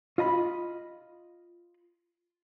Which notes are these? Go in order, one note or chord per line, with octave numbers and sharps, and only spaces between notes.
F4 D#5 A#5 B5